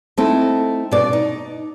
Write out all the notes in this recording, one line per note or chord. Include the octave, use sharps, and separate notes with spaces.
A3 C4 D#4 E4
B2 D5
D#4